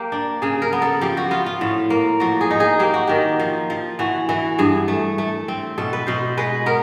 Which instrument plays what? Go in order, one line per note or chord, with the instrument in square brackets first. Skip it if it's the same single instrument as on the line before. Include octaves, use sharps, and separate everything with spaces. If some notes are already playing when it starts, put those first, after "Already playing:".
Already playing: [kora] A#3 G4
D4
C#3 G#4
A#4
B3
A4
F3 G4
F#4
B3 F4
F4
A2
A#3
F3 F#4
G#4
D#4
G#4
A#3 G4
F#4
D#3 G4
F3
F3
E3 F#4
E3 F#4
G2 G#4
A3
A3
C4
B2 A4
B4
B2 C5
G#3 B4
B3 A#4